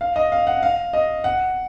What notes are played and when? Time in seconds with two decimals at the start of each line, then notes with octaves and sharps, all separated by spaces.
0.01 F5
0.16 D#5
0.32 F5
0.47 F#5
0.63 F5
0.93 D#5
1.24 F#5